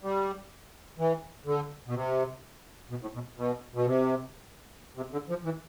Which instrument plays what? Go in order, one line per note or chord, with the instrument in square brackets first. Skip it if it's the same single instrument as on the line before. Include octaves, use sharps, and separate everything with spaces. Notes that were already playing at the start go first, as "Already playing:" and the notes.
[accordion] G3
E3
D3
B2
C3
B2
A2
B2
B2
B2
C3
C3
D3
F3
E3